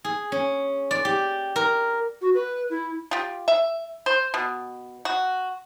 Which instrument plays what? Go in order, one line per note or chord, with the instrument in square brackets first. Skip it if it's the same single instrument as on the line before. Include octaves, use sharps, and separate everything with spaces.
[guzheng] G#4
C#4
D5
G4
A#4
[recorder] F#4
B4
E4
[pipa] F4 G4
E5
C5
B2
F#4